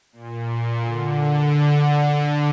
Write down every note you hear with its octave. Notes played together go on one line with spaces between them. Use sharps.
A#2
D3